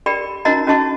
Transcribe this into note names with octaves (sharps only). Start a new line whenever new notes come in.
G4 A#4 D5 G5 B5
C#4 D#4 F#4 A#4 D#5 A#5
C#4 F#4 D#5 A5 C#6